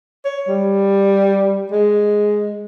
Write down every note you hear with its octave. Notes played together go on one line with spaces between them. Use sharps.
C#5
G3
G#3